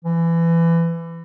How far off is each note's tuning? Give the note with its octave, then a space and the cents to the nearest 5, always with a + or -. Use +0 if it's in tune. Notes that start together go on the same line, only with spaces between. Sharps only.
E3 +25